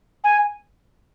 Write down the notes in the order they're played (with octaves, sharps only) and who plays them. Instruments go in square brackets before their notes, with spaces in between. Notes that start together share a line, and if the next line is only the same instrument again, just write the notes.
[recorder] G#5